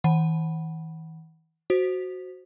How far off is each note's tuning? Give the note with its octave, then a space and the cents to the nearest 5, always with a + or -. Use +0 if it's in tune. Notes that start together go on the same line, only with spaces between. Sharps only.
E3 -40 F#5 +10 B5 -5
F#4 +0 C5 +0